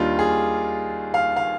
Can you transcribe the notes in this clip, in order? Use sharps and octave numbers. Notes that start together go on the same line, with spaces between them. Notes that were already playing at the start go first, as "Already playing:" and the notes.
Already playing: D#2 D#3 G3 D4 F4
G#4
F5
F5